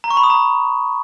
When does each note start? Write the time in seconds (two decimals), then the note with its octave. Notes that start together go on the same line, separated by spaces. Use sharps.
0.04 A#5
0.10 C#6
0.17 B5
0.23 D#6
0.30 A#5